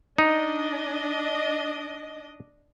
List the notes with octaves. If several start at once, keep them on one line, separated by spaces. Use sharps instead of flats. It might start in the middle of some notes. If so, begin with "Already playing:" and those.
D4 D#4 D#5